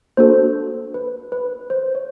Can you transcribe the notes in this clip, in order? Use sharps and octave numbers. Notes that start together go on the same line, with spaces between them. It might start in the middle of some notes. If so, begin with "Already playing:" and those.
A#3 D4 F#4 A4 C5
B4
B4
C5
C#5